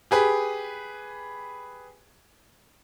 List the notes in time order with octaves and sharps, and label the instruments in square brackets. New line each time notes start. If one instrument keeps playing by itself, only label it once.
[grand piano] G4 G#4 B4